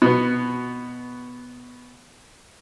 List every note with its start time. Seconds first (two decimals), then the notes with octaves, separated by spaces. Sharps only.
0.02 B2 B3